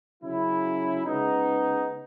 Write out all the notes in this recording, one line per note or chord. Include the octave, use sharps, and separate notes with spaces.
C#3 F#3 C#4 E4
C#3 G#3 B3 D#4